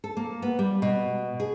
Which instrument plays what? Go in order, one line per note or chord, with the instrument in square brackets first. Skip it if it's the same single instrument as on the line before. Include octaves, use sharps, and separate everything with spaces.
[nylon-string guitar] A4
A#3
B3
G3
B2
G#4